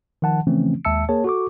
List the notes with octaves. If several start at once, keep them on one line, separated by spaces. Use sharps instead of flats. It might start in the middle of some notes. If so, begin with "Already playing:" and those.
D#3 F3 F#5 A5
C#3 E3 F3 A3 C4 C#4
D#2 G#3 E5 A5 E6 C#7
A#3 G#4 A#4 C#5 A5
F#4 A4 C#6 D6